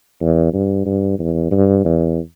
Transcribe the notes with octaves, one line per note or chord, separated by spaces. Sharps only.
E2
G2
G2
E2
G2
E2